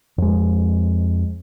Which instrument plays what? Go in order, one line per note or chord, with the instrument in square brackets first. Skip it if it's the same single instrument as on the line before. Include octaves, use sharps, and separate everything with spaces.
[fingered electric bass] F2 G#3